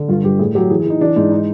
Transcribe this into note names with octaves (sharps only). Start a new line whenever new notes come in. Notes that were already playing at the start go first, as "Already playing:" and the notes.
Already playing: D3
G2 F4
G2 G4
A2 G#4
F#3 G4
E3 G#4
G#4
E3 D#4
E3 D4
G#2
D#4